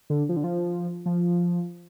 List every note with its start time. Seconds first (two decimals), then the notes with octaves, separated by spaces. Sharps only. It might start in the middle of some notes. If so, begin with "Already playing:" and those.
0.10 D3
0.29 F3
0.36 D3
0.44 F3
1.06 F3